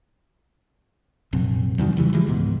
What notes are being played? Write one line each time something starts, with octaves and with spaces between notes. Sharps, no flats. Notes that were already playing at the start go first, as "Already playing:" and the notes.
A#1 F#2 C3
E2 G2 D#3 F#3
C#3 E3 G3
E3 F3 G#3
C#2 G#2 B2